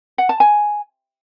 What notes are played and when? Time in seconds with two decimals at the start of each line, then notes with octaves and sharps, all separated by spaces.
0.18 F#5
0.29 A5
0.40 G#5